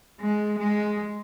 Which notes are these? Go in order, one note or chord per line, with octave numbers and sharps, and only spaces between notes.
G#3
G#3